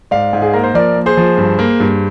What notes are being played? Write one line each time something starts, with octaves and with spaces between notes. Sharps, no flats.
G#2 D5 F5
G#2
G#4
A#3 A#4
C5
F3 A#4 D5
A#3
G#4 C5
F3
G2
A#3
G2